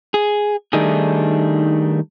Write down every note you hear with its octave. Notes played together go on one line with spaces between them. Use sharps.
G#4
D#3 G3 A3 D4 D#4 G#4